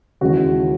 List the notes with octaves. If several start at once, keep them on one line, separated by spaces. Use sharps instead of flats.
D#2 C#3 E3 G#3 F#4